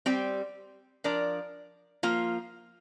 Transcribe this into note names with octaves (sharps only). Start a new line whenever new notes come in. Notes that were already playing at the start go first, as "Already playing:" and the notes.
G3 C4 G4
F3 D4 A#4 D5
F3 A#3 F4